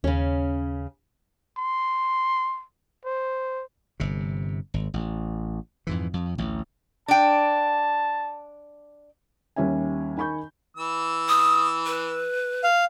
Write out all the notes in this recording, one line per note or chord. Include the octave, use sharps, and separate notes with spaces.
D#2 C#3 C#4
C6
C5
G1 C3
G#1
A1
F2 G#2 E3
F2
A1 D2
D4 G5 A5
D#2 G3 C#4 E5 G#5
D#3 G#5 B5 C#6 G6
E3 E6
D#6
B4
F5